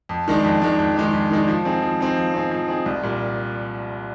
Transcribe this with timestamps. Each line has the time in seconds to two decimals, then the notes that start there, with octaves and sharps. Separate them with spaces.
0.09 F2
0.28 D#3 G#3 D4
0.44 F2
0.62 D#3 G#3 D4
0.79 F2
0.96 D#3 G#3 D4
1.13 F2
1.31 D#3 G#3 D4
1.48 F3
1.65 C4 D#4 G#4
1.82 F3
2.00 C4 D#4 G#4
2.17 F3
2.34 C4 D#4 G#4
2.51 F3
2.68 C4 D#4 G#4
2.86 C2
3.03 A#2 G3